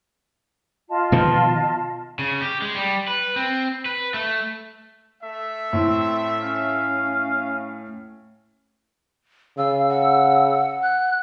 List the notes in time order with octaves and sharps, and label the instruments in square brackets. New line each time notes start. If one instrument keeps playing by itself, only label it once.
[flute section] F4 D#5 A5
[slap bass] B2 D#3 F3
[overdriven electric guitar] C#3
G4
G#3
G3
B4
C4
B4
A3
[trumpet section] A3 E5
[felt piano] A2 [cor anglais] C4
[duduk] C#4 [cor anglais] F5
[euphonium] C#3 [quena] F5 [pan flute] E6
[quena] F#5
[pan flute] F#6